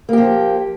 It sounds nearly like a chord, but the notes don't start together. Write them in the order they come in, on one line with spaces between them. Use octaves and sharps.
A#3 G4 F3